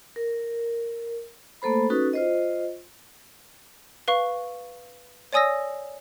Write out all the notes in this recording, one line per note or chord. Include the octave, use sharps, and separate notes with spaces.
A#4
A3 A#3 A4 C5 B5
C#4 D#4 F#4 A4 B4
F4 C5 D#5
B4 F5 C#6
C#5 D5 G#5 D#6 E6 A#6